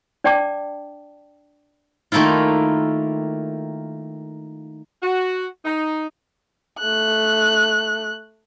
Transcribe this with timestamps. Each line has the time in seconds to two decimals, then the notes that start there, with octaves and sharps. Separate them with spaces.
0.24 D4 D5 G5 A5 D6
2.12 D#3 A3 A#3 E4 F4
5.02 F#4
5.65 D#4
6.79 A3 F#6